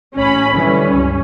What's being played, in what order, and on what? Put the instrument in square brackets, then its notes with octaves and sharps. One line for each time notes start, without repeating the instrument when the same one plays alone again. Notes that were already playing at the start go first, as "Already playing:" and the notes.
[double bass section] A1 [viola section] C#4 B5
[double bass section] D3 E3 G3 [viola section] C#4
[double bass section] C#2 G2